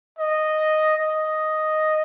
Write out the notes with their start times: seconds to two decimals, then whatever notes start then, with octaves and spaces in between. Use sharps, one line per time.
0.18 D#5
0.97 D#5